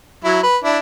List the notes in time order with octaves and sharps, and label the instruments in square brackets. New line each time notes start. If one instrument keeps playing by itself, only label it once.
[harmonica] F#3 E4
B4
D4 E4